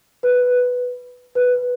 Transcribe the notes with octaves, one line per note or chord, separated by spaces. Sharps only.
B4
B4